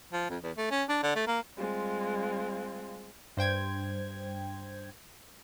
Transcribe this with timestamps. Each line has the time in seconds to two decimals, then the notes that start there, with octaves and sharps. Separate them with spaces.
0.12 F3
0.30 F2
0.43 E2
0.57 A3
0.71 C#4
0.89 D4
1.03 D3
1.16 A3
1.27 A#3
1.56 G3 G#3 C4 F4
3.37 G2 C5 G5 G#6